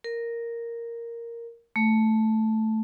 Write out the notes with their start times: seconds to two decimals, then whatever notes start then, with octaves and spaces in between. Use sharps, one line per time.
0.04 A#4
1.76 A3